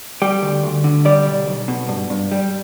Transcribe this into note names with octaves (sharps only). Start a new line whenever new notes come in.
G3 G4
D2
D2
D3
G3 D5
B1
B1
B2
G2
G2
G3